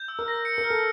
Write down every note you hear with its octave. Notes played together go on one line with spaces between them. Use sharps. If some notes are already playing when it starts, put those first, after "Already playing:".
Already playing: G6
E6
A#4
A#6
C#7
A#4
F6
A4